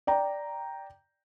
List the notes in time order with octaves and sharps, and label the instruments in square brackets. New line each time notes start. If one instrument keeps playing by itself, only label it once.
[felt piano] D5 G5 A#5